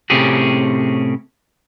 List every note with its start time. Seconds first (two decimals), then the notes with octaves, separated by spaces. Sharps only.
0.10 A2 C3 C4 C#4 G4 G#4